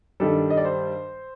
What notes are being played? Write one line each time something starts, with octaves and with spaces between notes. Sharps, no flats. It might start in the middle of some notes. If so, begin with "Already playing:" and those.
G2 D#3 G3 A4
D#5
D5
C5